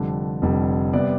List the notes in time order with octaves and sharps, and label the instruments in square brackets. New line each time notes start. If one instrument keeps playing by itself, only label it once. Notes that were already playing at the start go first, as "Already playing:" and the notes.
Already playing: [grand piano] F1 F2 D3 G3
F1 F2 D3 G3
C3 G3 B3 D5